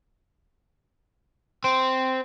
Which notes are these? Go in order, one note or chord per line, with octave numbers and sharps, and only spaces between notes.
C4